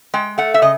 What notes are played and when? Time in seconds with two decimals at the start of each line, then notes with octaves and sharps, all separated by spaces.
0.14 G#3 G5
0.38 A3 F#5
0.54 E5
0.62 C#3 D#5